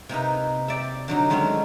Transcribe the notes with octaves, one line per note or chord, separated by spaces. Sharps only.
C3 A#3 D#4 B4
G4 D5 E5
D3 F#3 D#4
D#3 G#3 A3 C4 C#4